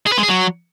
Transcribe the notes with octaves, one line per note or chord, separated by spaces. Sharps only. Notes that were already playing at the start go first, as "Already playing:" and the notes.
G#4
B4
G#3
G#4
F#3